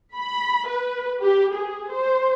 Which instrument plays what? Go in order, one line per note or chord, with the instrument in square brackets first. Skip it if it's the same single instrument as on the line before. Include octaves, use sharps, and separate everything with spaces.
[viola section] B5
B4
G4
G#4
C5